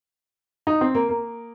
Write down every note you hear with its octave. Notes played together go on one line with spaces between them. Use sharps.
D#4
C4
A#3
A#3